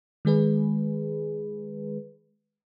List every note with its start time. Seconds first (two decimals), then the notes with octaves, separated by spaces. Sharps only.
0.25 D#3 G#3 G#4 B4